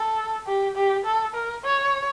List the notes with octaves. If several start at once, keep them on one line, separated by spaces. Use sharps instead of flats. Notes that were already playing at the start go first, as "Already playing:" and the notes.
Already playing: A4
G4
G4
A4
A#4
C#5